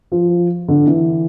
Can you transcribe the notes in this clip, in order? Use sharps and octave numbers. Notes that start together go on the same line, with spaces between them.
F3
D3
E3